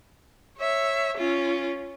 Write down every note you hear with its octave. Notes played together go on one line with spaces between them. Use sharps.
C#5 E5
C#4 F4